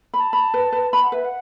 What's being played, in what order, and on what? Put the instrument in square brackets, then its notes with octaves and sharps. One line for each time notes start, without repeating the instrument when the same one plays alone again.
[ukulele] B5
[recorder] A5
[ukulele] B5
B4
B4
[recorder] A5 [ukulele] B5
[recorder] F#5
[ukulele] B4 [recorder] E5
[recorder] F#5